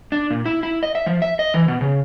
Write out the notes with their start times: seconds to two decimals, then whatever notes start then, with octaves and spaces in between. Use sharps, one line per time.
0.12 D4
0.30 A#2
0.46 E4
0.63 E4
0.83 D#5
0.95 E5
1.06 F3
1.22 E5
1.39 D#5
1.54 E3
1.68 B2
1.81 C#3